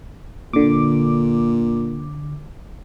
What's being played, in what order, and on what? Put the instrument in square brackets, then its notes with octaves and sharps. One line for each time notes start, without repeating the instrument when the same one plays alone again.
[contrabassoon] A#2 [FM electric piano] D3 D6